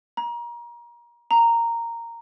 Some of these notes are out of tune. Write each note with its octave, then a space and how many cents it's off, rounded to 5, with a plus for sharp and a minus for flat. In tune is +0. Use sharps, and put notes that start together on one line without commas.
A#5 +30
A#5 -10